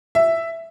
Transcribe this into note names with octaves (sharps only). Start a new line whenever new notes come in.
E5